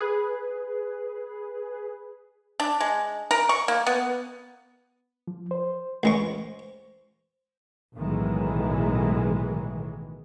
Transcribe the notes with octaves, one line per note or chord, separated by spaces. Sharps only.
G#4 B4
D4
G#3
A#4
C#6
A#3
B3
F3
C5
C#2 G#3 C#6
B1 A2 D#3 E3 G#3